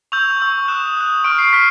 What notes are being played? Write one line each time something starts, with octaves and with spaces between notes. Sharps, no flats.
C#6 E6 G6 F7
C#6 E6 G6
D#6 F#6 E7
D#6 F#6
C#6 F6 D7
C7
C#6 F6 B6